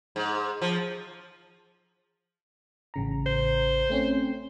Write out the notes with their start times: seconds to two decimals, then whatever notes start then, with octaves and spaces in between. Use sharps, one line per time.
0.16 G#2
0.62 F3
2.94 A1 C#3 A#5
3.26 C5
3.90 A3 C4 C#4